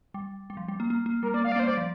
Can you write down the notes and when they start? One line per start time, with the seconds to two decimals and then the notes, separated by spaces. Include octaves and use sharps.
0.14 G3
0.50 G3
0.57 F3
0.68 G3
0.80 A#3
0.90 A#3
1.06 A#3
1.23 G3 A#4
1.34 A#3 D5
1.44 G3 F5
1.52 D5
1.56 A#3
1.60 C5
1.66 G3 D5
1.77 F3